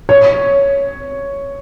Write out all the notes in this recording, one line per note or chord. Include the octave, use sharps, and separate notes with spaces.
C#5